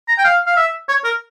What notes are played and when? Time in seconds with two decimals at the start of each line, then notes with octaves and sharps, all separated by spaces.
0.08 A#5
0.18 G5
0.25 F5
0.47 F5
0.57 E5
0.89 C#5
1.04 A#4